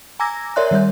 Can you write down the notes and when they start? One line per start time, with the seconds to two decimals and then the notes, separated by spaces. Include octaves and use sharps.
0.20 G#5 A#5 D6 E6 G#6 A#6
0.56 A#4 C#5 D5 E5 C6 F#6
0.71 D#3 G3 E5 G6